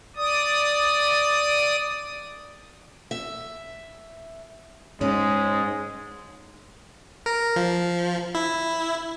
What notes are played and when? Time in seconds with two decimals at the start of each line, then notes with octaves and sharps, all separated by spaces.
0.16 D5 D#6
3.11 E5
5.01 G#2 G#3 C#4
7.26 A#4
7.56 F3
8.35 E4